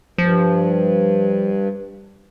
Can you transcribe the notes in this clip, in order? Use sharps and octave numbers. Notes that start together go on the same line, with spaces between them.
G2 F3